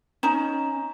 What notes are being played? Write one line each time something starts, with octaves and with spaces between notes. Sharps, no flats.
C#4 D#4 A#5 E7